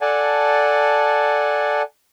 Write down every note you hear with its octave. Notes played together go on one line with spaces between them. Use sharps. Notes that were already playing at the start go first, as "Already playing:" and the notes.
A4 D5 F#5 G#5 A5